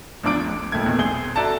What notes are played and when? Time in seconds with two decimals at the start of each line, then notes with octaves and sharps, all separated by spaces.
0.23 A1 E2 F3 D4 D6 D7
0.45 A1
0.72 E1 F2 A#2 A3 G#6
0.86 E2 B2 D#3
0.98 A1 C4 G#4 G7
1.35 F#4 A4 D5 E5 A5 A#5